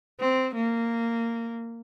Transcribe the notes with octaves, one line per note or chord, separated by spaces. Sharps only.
C4
A#3